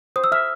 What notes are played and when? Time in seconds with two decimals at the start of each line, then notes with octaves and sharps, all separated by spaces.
0.16 C5 D#6
0.24 E6
0.32 E5 F6